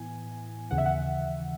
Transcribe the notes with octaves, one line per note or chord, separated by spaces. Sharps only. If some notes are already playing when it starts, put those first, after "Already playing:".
Already playing: A2 E3 B3 E4 G#5
D#2 C#3 E3 F#5
E5
F#5